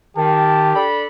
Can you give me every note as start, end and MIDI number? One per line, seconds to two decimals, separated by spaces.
0.17 0.74 51
0.17 0.87 67
0.17 0.80 81
0.75 1.05 62
0.75 1.05 69
0.75 1.05 83